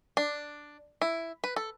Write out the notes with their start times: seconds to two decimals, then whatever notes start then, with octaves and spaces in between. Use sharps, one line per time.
0.17 D4
1.01 E4
1.44 B4
1.56 A4